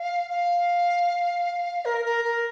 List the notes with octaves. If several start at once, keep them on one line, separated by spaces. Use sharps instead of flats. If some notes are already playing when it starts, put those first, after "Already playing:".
Already playing: F5
F5
A#4
A#4
A#4